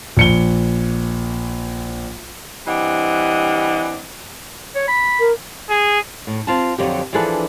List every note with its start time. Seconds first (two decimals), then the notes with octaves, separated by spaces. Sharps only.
0.17 A#1 C#7 G7
2.67 E3 G3 C4 D4 D#5 F#5
4.75 C#5
4.88 B5
5.20 A#4
5.70 G#4
6.27 A2
6.47 C4 F4 A5
6.78 F2 D3 F#3 D#4 G4
7.13 E3 F3 D4 G#4 A4 B4